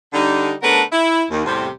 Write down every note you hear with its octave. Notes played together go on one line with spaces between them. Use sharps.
D3 G3 D#4
C#3 A3 B3 D4 A#4 B4
E4
D#2
E2 A2 C3 G3 C4